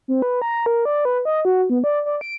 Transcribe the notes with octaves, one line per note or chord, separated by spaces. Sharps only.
C4
B4
A#5
A#4
D5
B4
D#5
F#4
B3
D5
D5
D7